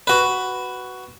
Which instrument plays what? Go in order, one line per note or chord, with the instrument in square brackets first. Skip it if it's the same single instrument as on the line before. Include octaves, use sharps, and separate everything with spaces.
[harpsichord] F#4 B4